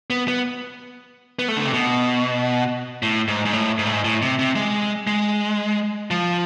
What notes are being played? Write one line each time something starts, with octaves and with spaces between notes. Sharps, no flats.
B3
B3
B3
A3
D3
C3
B2
A2
G#2
G#2
A2
G#2
A2
G#2
A2
C3
C3
G#3
G#3
F3